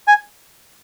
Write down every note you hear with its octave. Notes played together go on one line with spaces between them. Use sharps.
G#5